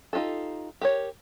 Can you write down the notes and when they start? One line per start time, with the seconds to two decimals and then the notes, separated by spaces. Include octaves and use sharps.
0.13 D#4 F4 G4 A4
0.81 G4 A#4 C#5